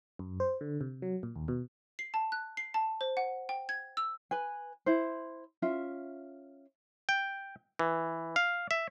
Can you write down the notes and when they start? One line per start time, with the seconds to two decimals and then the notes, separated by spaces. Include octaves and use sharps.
0.19 F#2
0.40 C5
0.61 D3
0.81 C3
1.02 F#3
1.23 A#2
1.36 D#2
1.48 B2
1.99 C7
2.14 A5
2.32 F#6
2.57 C7
2.74 A5
3.01 C5
3.17 F#5
3.49 G5
3.69 G#6
3.97 E6
4.31 B4 G#5
4.86 E4 C5
5.62 C#4 F4 E5
7.09 G5
7.79 E3
8.36 F5
8.71 E5